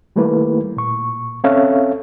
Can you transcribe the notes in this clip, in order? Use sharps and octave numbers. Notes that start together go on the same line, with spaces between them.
D#3 G3 A3 A#3 E4 B4
A#2 C#6
C4 C#4 A4 C#5 E5 F5